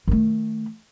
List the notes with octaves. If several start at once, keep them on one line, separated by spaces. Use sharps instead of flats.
D#3 A3